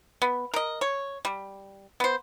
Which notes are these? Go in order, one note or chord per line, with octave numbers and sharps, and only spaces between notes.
B3
A#4 D#5
C#5
G3
B3 C5